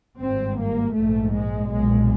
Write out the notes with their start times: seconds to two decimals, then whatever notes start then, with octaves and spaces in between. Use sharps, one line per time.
0.20 G#1 G2 C4
0.58 A#3
0.95 A#1 G#2 A3
1.34 G#3
1.71 B1 A#2 G#3